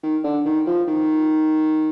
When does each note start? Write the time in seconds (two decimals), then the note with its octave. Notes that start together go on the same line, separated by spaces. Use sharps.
0.03 D#3
0.24 D3
0.45 D#3
0.67 F3
0.88 D#3